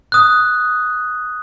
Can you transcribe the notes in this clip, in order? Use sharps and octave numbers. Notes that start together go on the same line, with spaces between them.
D#6 F#6